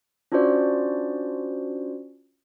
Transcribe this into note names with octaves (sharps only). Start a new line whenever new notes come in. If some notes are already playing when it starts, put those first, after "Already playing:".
C#4 D4 F4 F#4 C5 D5